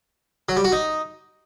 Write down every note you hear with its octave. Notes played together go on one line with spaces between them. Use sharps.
F#3
G3
F#4
D#4